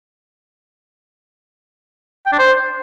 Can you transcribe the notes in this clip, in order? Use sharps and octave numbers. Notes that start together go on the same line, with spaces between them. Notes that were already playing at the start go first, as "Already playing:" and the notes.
G5
D4
C5